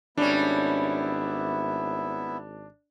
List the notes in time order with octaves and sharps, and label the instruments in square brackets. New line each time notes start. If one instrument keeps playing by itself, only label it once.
[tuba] G#1 [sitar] G3 C#4 [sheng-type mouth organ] B3 E4 E5 [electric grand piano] D4